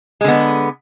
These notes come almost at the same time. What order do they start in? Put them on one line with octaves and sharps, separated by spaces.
G#3 D3 B3